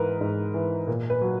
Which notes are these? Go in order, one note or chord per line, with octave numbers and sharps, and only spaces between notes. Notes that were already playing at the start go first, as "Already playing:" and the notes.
Already playing: G#2 E3 A#4 B4
G#2
E3
A#2
B4
F#3